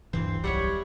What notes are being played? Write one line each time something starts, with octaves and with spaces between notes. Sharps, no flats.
D1 G2 E3 C4 C5
B1 G3 C#5 E5 F#5